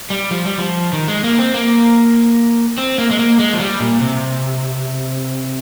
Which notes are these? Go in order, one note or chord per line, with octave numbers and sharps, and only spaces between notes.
G3
F3
G3
F3
D#3
G#3
A#3
C4
A#3
C4
A#3
G#3
A#3
G#3
F3
G3
A#2
C3